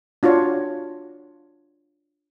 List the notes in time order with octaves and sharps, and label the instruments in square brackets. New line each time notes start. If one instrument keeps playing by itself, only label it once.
[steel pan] D4 F4 F#4 C#5